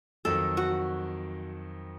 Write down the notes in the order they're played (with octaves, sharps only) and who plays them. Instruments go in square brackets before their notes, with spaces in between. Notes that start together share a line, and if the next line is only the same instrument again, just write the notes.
[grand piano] F2 D#3 F#3 [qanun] A4
[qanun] F#4